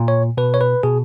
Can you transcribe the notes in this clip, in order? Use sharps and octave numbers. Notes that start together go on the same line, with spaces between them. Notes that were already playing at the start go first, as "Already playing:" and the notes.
Already playing: A#2
C#5
B2 B4
C#5
B4
B2 G#4